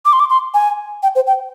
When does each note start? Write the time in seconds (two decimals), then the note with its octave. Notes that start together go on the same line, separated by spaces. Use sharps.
0.05 D6
0.13 C6
0.20 D6
0.30 C6
0.54 G#5
1.03 G5
1.15 C5
1.27 G5